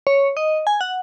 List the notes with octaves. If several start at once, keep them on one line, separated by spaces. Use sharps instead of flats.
C#5
D#5
G#5
F#5